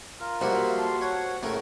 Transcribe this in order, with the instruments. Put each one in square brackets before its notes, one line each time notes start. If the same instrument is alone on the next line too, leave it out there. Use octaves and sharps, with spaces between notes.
[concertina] F4 A#4
[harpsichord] F3 G3 A#3 [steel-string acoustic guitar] F#4 C5 E5
[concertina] A4 C6
[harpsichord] C#5 [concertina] F#5
[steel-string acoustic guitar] A2 [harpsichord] C#3 A3 A#4